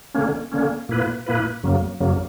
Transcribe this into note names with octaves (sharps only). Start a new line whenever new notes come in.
D3 A#3 C#4
D3 A#3 C#4
A#2 A#3 E4 B4
A#2 A#3 E4 B4
F#2 C#3 F#3 A#3
F#2 C#3 F#3 A#3